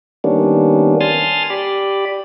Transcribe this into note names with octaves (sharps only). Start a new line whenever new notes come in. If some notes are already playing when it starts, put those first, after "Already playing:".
D#3 G3 A#3 B3 C#4 D4
G#5 A5 C6 D#6 F6 A6
G4 D5 B5